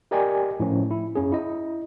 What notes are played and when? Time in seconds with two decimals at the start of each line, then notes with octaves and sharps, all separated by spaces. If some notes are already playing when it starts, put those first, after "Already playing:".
0.11 G4 A#4 D5 D#5 G5 G#5
0.60 A2 F3 C#4
0.91 E4
1.16 F#2 C#4 G#4
1.32 E4 D#5